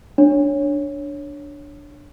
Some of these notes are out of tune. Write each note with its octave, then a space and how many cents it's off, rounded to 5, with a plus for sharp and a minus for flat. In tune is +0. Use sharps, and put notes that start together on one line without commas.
D4 +0 C#5 +0